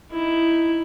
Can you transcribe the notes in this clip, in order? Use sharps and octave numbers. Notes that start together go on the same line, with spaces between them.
D#4 E4